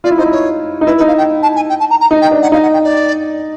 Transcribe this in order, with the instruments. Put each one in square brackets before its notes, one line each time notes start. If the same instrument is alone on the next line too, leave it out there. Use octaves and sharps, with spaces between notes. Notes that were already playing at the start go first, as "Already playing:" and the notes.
[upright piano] F4 [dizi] D5
[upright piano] E4
[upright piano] D#4 [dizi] C5
[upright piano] E4
[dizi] C#5
[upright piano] D#4
[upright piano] E4 [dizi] B4
[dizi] B4
[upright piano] D#4
[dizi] F5
G5
A5
G#5
G5
A5
A#5
A#5
[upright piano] D#4
[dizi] G5
[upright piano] D4
[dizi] F#5
[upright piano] D#4 [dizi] F5
[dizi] F#5
G5
D5